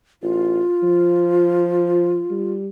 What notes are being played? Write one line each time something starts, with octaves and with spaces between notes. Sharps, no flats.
A1 F4
F3
G3